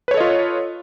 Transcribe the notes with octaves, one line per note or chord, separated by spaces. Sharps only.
F4 A4 B4 C#5 D#5